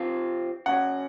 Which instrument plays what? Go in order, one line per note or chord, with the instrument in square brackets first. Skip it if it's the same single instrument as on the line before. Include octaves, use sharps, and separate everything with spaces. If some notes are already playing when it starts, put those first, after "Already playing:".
Already playing: [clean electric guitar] C3 F3 C4 F4
[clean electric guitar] C#3 F#3 C#4 [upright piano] F#5